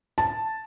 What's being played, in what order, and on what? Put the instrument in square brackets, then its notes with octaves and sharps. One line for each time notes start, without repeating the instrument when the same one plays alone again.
[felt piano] A5